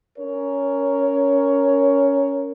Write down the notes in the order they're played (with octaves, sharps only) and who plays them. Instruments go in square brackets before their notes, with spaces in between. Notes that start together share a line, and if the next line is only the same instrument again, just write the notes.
[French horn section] C#4 A#4 C#5